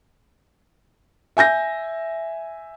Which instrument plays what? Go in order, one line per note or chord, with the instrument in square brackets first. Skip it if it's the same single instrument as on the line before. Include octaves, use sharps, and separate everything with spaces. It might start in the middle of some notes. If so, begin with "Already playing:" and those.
[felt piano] E5 G#5 G6 A#6